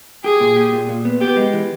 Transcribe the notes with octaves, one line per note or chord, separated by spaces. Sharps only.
G4 G#4
A#2
G4
A#2
A#2
B3
B3 G4
G#3
E3